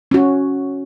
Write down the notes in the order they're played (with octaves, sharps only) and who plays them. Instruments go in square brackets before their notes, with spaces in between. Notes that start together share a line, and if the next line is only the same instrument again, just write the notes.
[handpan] C#4 F#4